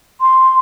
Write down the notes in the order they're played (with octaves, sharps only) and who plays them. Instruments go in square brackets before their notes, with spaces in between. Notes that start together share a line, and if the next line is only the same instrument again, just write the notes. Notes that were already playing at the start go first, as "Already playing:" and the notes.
[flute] C6